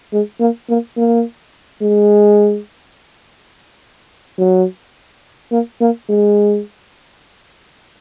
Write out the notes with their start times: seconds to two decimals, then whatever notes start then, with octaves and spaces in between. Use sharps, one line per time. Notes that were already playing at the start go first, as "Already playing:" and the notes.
0.13 G#3
0.40 A#3
0.69 A#3
0.97 A#3
1.82 G#3
4.39 F#3
5.52 A#3
5.81 A#3
6.09 G#3